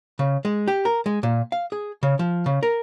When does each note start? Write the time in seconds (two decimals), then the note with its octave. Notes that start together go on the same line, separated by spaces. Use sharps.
0.19 C#3
0.45 G#3
0.68 G4
0.85 A#4
1.06 G#3
1.23 A#2
1.52 F5
1.72 G#4
2.03 C#3
2.19 F3
2.46 C#3
2.63 A#4